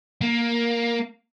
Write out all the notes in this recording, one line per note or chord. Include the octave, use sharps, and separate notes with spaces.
A#3